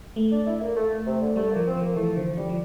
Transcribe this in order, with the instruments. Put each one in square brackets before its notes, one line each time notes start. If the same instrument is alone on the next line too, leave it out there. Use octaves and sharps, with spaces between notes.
[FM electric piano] A3
[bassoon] D4
E4
A#3
A3
C3
D3
[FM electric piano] G3 [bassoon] A3
[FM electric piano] F3 [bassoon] A#3
[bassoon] C4
[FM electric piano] F3
[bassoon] A#3
[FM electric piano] E3 [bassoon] A3
[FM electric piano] D3 [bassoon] F3
[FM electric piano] D3 [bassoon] G3
[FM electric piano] F3